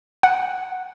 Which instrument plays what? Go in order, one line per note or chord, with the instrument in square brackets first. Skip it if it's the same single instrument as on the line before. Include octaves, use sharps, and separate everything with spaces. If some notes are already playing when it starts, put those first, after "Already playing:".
[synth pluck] F#5